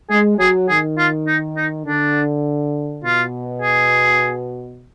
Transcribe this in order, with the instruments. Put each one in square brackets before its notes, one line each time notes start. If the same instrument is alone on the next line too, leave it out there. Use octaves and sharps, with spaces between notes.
[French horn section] G#3 [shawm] G#4
[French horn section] F#3 [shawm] G#4
[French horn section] D#3 [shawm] G#4
[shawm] F4
D#4
D#4
[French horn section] D3 [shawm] D4
[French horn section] B2 [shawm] F4
[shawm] G#4